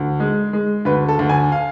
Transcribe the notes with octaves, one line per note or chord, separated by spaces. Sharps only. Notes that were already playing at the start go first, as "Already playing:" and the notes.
Already playing: D2
G#3
G#3
D2 B4
A4
D2
G#5
F5